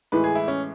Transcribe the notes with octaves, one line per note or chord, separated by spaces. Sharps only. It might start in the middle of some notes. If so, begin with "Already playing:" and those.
A2 E3 G#3 B4
G#4
E4
C#4